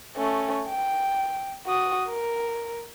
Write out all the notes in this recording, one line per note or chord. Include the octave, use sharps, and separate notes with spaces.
A3 C#4
G5
F#4 D#6
A#4